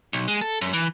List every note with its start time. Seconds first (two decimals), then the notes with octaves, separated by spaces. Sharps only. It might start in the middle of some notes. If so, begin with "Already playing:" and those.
0.13 B1
0.28 G#3
0.41 A4
0.61 F#2
0.73 E3